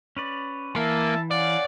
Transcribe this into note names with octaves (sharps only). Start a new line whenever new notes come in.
C#4 B4 D5
E3 A#3 E5 G#5 A5
C#4 D5 F5 F#5